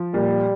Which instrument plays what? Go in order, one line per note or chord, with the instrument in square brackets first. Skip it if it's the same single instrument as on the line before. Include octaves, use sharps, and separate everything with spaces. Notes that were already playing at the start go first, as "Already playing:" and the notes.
Already playing: [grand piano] F3
[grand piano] A#2 [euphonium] G3